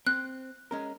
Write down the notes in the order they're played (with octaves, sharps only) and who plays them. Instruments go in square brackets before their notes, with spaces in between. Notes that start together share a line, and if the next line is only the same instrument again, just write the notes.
[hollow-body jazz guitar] C4 [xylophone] F#6
[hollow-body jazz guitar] G#3 C#4 A#4